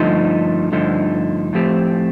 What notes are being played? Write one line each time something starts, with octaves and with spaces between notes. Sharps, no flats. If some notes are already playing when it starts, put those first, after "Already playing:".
Already playing: G2 D3 F3 A3 D#4
G2 D3 F3 A3 D#4
A2 F3 A3 C4 G4